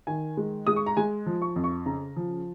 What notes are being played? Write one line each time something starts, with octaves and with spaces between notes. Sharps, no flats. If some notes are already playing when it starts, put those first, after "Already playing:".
D#3 G#5
G#3
G#3 D#6
C#6
A#5
G#3 G#5
F3
C#6
F2
C#6
C#3 A#5
F3